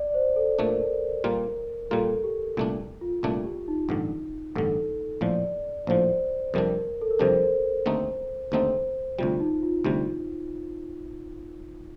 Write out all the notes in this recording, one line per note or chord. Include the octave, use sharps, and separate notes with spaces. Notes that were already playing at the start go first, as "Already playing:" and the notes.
Already playing: D5
C5
A4
A#2 A3 D4 A#4
A#2 G3 A#3 F4 A#4
A#2 G3 A#3 F4 A4
G4
C2 A#2 A3 D4
F4
C2 A#2 A3 D4 F4
G4
D#4
A1 G2 D3
A1 G2 D3 A4
A#1 A2 F3 D5
A#1 A2 F3 C5
F2 C3 G3 D4 A#4
A4
A#4
F2 C3 G3 D4 C5
D#2 D3 A3 C4 D#4
D#2 D3 A3 C4 D#4 C5
D2 C3 G3 F4
D#4
F4
D2 C3 G3 F4